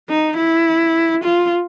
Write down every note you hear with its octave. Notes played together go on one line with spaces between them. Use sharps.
D#4
E4
F4